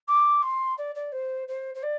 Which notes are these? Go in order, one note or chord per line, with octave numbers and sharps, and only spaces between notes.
D6
C6
D5
D5
C5
C5
C5
D5